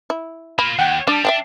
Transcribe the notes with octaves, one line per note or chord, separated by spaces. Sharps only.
E4
A#3 F4 B5
D#2 F#5 G5
G3 D4 A5
D4 E5 F5 G5